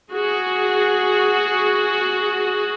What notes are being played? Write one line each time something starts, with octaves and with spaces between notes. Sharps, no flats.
F#4 G#4